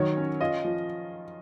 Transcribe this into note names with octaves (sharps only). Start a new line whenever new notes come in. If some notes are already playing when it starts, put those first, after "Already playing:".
Already playing: D#3 F#3 C#5
C#4
F4 D#5
F3